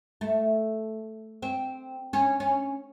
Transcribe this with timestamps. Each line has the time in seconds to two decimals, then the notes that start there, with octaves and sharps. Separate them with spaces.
0.21 A3
1.42 C4
2.13 C#4
2.40 C#4